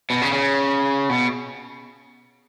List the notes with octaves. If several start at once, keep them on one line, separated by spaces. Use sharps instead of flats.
B2
C#3
C#3
B2